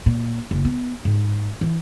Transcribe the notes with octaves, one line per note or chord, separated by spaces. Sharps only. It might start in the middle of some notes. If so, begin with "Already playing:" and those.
A#2
F#1
B3
G#2
E3